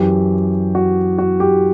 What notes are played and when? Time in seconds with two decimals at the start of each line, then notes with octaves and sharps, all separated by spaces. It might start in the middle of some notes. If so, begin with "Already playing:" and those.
Already playing: F#2 E3 G4
0.75 F#4
1.18 F#4
1.40 G4